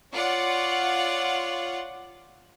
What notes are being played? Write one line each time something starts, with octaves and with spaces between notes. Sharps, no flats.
F4 C#5 D5 F#5